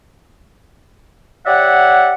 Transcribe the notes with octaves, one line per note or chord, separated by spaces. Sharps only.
G4 C#5 D5 E5 F#5